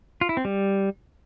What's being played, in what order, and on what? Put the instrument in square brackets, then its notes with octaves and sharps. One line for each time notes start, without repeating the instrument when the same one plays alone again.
[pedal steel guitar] F4
E4
C4
G3